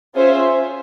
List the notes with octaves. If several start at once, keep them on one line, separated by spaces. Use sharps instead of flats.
C#4 F4 G#4 C5 E5